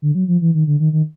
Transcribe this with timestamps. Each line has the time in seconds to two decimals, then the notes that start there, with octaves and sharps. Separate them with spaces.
0.02 D3
0.15 F#3
0.28 F3
0.41 E3
0.54 D#3
0.67 D3
0.80 D#3
0.93 D#3